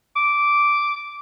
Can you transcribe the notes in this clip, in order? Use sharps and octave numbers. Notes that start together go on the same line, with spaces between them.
D6